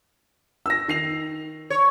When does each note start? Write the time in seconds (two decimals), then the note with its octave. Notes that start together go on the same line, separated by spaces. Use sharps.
0.66 E6 A#6
0.88 D#3 C7 F7
1.70 C#5